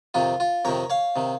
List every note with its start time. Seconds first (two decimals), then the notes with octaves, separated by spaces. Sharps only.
0.14 F2 C3 D#3 F4
0.40 F4
0.65 F2 C3 D#3 A#4 C#5
0.90 C#5 F5
1.16 C3 D#3